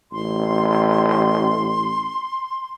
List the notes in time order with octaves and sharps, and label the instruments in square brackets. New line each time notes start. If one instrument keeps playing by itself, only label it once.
[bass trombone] A1 [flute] C6